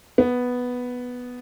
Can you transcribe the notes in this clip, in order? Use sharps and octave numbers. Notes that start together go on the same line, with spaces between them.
B3